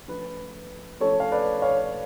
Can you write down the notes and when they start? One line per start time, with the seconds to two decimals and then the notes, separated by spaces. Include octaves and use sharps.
0.08 F3 A3 C#4 B4
1.00 F3 A3 C#4 A4 C#5
1.20 F5
1.32 B4 D5
1.62 C#5 F5